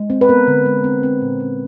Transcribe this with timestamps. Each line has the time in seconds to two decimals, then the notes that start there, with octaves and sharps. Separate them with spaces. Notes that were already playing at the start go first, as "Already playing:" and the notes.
Already playing: G#3
0.10 C4
0.21 B4
0.29 B3 A#4
0.47 D3
0.66 G#3
0.84 C4
1.03 C4
1.21 A#2
1.40 C#4